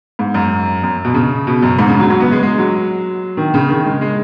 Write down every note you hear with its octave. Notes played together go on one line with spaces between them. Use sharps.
G#2
F#2
F#2
B2
C#3
B2
F#2
G#2
C#3
F#3
F#3
B3
G#3
G#3
F#3
D#3
C#3
D#3
G#3
G#3